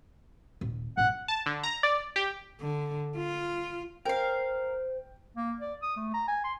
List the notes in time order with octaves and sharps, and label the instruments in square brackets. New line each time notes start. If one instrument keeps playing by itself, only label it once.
[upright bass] D#1
[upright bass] A#1 G2 [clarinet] F#5
[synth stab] A5
D3
A#5
D5
G4
[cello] D3
F4
[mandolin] A#4 F5 [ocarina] C5 [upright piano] G5
[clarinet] A#3
D5
D#6
A3
A#5
G#5
C6